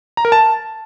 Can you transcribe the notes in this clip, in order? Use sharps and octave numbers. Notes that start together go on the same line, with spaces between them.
A#5
A#4
A5